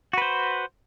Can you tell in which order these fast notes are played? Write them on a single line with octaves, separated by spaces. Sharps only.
F#4 B4 C5